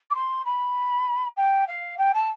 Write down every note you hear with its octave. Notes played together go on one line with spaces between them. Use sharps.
D6
C6
B5
G5
F5
G5
A5